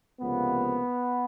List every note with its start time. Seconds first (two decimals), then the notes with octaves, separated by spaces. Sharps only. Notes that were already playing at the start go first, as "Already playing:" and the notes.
0.20 C#2 C3 F3 A#3 B3